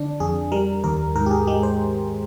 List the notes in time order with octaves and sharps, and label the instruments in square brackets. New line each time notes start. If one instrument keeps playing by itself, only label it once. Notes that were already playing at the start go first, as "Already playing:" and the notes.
Already playing: [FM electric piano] D3 D4
F2 G#4
G3 A#4
D#2 A#4
G#2 A#4
G4
G#4
G#3 G4
C5